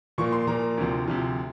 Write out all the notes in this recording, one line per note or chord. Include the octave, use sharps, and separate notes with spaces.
A#2 F3 A#3 C#6
C6
A#2 F3 A#3 A#5
D2 C3 F3
D2 C3 F3